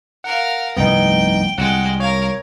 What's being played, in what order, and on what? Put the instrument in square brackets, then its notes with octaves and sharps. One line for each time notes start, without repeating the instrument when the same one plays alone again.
[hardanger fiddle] A#4 F5 [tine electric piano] F#5
[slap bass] F1 C2 G2 [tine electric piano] B3 D#4 [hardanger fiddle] G5
[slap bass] C2 [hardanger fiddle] G#3 G5 [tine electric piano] F#5
[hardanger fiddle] A#4 F5 [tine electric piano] C#5 G#6